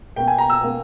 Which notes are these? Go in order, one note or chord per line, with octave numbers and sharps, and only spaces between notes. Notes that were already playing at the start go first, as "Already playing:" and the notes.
B2 A#3 G5
G#5
A#5
E6
B2 A#3